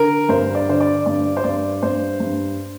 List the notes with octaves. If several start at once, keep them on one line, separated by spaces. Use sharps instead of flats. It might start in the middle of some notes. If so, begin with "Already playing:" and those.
Already playing: D3 A#4
G2 C5
D5
D3 C5
D5
G2 D5
C5
G2 D5
G2 C5
G2